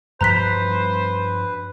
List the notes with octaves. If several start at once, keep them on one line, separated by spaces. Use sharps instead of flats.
G2 F3 G3 B4 C5 A#5 F#6 B6